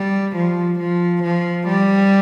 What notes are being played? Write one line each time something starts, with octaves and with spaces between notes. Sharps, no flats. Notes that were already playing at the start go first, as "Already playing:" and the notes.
Already playing: G3
F3
F3
F3
G3